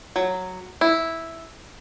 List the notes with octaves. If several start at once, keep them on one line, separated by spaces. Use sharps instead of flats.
F#3
E4